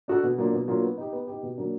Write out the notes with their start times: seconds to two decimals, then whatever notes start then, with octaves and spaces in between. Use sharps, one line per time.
0.08 D4 F#4 A4
0.23 B2
0.38 F#3 A#3 D4 F4
0.53 B2
0.68 F#3 A#3 D4 F4
0.83 B3
0.97 D#4 G4
1.13 B3
1.27 D#4 G4
1.43 B2
1.58 F#3 A#3 D4